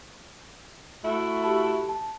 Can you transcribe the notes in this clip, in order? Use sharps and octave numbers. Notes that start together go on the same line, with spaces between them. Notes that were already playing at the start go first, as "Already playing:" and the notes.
A3 E4 F#4
G4 A5 B5
A5